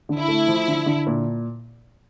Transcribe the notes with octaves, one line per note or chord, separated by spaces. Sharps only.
D3
E4
A3
F3
D3
D3
A#2